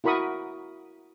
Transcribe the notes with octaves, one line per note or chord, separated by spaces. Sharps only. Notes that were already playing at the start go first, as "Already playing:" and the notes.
E4 F#4 A#4 B5 C#6 D#6